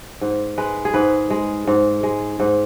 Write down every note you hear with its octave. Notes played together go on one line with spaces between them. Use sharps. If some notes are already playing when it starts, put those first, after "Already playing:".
G#2
G#3 B4
G#4
G#2 B4
G#3
G#2
G#3
G#2